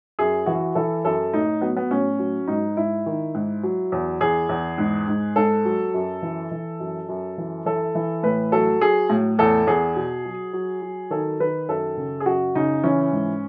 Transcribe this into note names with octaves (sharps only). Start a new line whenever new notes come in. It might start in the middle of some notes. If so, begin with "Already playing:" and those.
F#2 G#4
E3 F#4
E3 A4
F#2 A4
A2 D#4
F#3 B3
B3
A2 C#4
F#3
G#2 D#4
G#2 E4
D#3
G#2
F#3
E2
E2 G#4
E2
G#2
G#2
G#2 A4
F#3
F#2
E3
E3
F#2
F#2
E3
E3 A4
E3
A2 B4
F#3 A4
F#3 G#4
A2
E2 A4
E2 G#4
B2
F#3
F#3
F#3
D#3 A4
D#3 B4
F#2 A4
C#3
G#4
F#2 F#4
C#3 D#4
E3 C#4
G#2